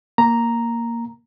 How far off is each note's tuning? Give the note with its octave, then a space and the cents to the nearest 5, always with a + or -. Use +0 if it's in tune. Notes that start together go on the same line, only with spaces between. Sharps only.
A#3 +0 A#5 +0